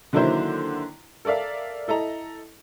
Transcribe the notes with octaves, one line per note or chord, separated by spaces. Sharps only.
D3 D#3 F#3 A#3 E4 C5
A4 A#4 D5 E5 F5
E4 A4 D#5 A#5